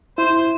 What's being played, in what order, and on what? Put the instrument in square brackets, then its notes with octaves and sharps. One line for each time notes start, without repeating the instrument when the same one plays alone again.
[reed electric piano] E4 [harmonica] C5